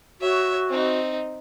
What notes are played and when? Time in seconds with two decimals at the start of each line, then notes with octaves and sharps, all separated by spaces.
0.21 F#4 C#5 E5
0.70 C4 D#4